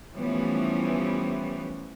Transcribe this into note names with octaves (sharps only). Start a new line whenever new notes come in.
E3 F3 G3 A3 B3 C#4